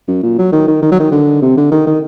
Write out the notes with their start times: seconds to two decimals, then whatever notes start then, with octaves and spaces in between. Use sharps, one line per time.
0.08 F#2
0.23 A#2
0.39 F#3
0.53 D#3
0.68 D#3
0.82 D#3
0.92 F#3
1.00 D#3
1.12 D3
1.42 C3
1.57 D3
1.72 D#3
1.87 D#3